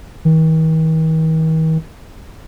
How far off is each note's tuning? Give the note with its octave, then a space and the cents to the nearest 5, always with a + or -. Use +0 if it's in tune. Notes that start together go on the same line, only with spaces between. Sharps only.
D#3 +45